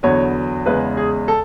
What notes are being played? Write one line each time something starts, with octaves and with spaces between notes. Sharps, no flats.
E2 D3 F#3 B3 C#5
E2 C#3 G#3 B3 B4
G#4
A4